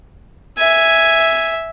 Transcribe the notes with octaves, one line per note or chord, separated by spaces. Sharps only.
E5 G#5